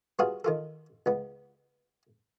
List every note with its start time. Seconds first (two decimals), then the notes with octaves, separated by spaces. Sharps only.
0.19 G3 B3 F4 F#4 G#4 F5
0.45 D#3 F4 A4
1.06 C#2 B3